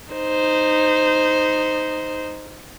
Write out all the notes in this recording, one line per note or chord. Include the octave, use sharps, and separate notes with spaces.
D#4 C5